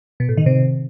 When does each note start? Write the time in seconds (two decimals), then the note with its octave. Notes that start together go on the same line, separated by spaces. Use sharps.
0.20 B2
0.29 A2
0.37 D#3
0.46 C3